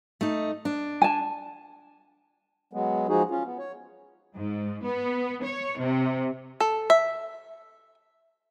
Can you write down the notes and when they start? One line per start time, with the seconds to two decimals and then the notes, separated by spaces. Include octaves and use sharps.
0.21 A3 D#4
0.65 D4
1.02 G#5 A5
2.73 F#3 G#3 B3
3.08 F3 G#3 D#4 F#4 G#4
3.30 C#4 F4
3.44 B3
3.59 C#5
4.36 G#2
4.84 B3
5.43 C#5
5.78 C3
6.60 A4
6.90 E5